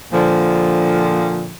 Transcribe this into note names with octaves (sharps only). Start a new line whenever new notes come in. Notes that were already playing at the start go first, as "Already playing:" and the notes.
A#2 D3 F3